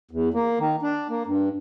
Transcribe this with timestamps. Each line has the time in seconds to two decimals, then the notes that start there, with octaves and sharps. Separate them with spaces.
0.11 E2
0.34 A#3
0.59 D#3
0.82 D4
1.09 A#3
1.27 G2